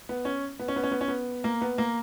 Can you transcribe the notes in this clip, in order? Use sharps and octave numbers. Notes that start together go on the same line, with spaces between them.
B3
C#4
B3
C#4
B3
C#4
B3
C#4
B3
A#3
B3
A#3